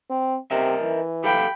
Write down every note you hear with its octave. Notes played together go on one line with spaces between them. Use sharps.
C4
C3 A#4 D#5 E5
E3
G4 A4 F5 G5 B5